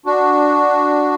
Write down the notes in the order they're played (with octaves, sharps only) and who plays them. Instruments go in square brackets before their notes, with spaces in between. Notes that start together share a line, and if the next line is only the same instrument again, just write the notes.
[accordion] D4 F#4